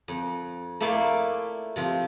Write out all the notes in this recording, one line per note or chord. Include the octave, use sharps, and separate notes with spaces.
F2
A3 A#3 E4 D5 F5 A5
C3 F3